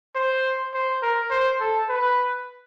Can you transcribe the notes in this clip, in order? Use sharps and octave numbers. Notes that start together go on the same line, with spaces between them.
C5
C5
A#4
C5
A4
B4